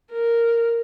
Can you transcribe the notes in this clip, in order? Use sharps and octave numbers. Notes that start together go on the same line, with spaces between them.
A#4